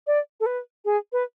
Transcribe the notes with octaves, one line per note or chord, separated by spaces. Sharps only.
D5
A4
B4
G#4
B4